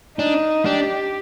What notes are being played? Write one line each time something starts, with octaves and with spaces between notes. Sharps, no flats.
D4 D#4
D4 G4